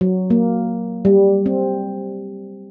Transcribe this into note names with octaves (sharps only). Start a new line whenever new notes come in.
F#3
A#3
G3
C4